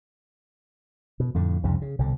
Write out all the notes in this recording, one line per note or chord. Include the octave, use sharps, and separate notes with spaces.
B2
F2 A2 D3
C2 F2 G#2 C#3
C#3
C2 B2 D3